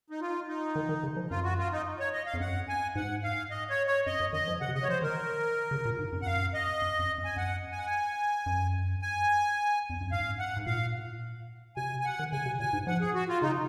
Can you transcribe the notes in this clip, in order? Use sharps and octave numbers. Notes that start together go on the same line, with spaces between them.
D#4
F4
D#4
D#3
D#3
C#3
F3
F#2 F4
F#4
F4
D#4
C#5
D#5
F5
F2
F#2 F#5
G#5
G#2 F#5
F5
D#5
C#5
C#5
F#2 D#5
F#2
D#3 D#5
F3
C#3 F#5
C3
C#3 D#5
C#5
F3 C5
D#3 A#4
C#3
A#2
G#2
F#2
F#5
F#2 F5
D#5
F#2
F#2
F#2
G#5
F#2 F#5
G#5
F#5
G#5
F#2
G#5
F2
F#2
G#2 F5
F#5
G#2
A#2 F5
C3 G#5
G#5
F#5
D#3
C#3 G#5
C3
A#2 G#5
G#2
F3 F#5
G#4
F#4
F4
C#3 D#4